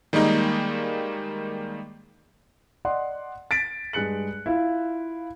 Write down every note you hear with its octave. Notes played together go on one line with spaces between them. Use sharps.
D#3 G3 G#3 A#3 D#4
D5 D#5 F#5 C6
A6 B6 D7
G2 G#3 F#6 C#7 F#7
E4 F4